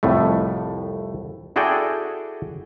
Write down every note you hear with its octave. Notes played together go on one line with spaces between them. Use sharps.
C2 F2 A2 A3
E4 F#4 G#4 A4 D5 G5